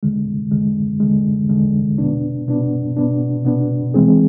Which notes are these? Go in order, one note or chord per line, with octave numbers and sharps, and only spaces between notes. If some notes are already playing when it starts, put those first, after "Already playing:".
E2 D3 G#3
E2 D3 G#3
E2 D3 G#3
E2 D3 G#3
B2 B3 D4
B2 B3 D4
B2 B3 D4
B2 B3 D4
E3 G#3 C4 G#4